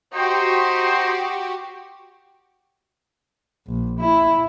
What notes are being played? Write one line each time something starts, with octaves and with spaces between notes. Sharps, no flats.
D#4 F#4 G4 C5
A#1
E4